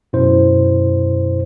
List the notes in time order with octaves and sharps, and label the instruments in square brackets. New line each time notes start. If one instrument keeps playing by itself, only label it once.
[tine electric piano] F#2 B2 E4 C5